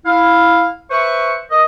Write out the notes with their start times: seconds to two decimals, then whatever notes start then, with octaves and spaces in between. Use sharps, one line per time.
0.05 E4 F5
0.91 B4 C5 E5 C#6
1.51 A#4 D#5